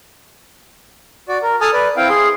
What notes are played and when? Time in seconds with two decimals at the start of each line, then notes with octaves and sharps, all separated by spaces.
1.29 F#4 D5
1.42 A#4
1.61 A4 G#5 A5 D#6 F6
1.73 B4 D5
1.97 C4 E4 F5 G5
2.09 G#4 C6